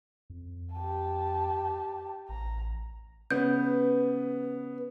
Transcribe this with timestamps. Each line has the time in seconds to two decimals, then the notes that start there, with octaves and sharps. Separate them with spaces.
0.30 F2
0.75 G4 A5
2.29 A1 A#5
3.31 C#3 B3 B4 G6